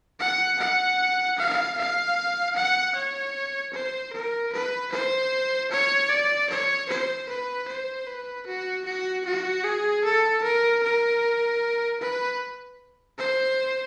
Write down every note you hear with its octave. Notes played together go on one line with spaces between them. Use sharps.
F#5
F#5
F5
F5
F#5
C#5
C5
A#4
B4
C5
C#5
D5
C#5
C5
B4
C5
B4
F#4
F#4
F#4
G#4
A4
A#4
A#4
B4
C5